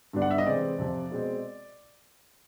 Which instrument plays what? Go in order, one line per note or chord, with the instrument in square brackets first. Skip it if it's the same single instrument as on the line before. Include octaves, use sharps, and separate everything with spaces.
[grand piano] G2 D3 G3 B3 D4
F#5
E5
D#5
C3 E3 G#3 C4 D5
F2 C3 F3
B2 G#3 C4